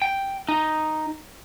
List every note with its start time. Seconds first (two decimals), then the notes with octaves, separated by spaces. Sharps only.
0.02 G5
0.48 D#4